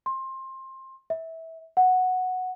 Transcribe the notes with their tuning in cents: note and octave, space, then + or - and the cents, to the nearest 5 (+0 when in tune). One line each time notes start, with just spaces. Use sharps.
C6 +20
E5 -20
F#5 -5